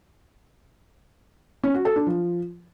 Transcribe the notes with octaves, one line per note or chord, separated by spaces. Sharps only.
C#4
F#4
A4
D4
F3